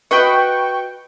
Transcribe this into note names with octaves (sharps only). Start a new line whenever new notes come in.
F#4 B4 D#5 G5 C#6